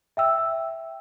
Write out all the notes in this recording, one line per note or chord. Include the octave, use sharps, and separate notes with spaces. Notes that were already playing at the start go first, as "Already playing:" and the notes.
E5 G5 E6